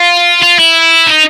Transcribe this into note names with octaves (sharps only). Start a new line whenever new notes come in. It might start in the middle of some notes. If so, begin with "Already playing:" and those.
Already playing: F4
F4
E4
D#4